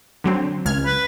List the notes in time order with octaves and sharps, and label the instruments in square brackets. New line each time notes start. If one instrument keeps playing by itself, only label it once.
[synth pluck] D3 F#3 C4
C#2 F6 G#6
[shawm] B4